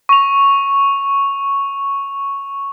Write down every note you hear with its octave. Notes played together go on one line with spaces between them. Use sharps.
C#6 F7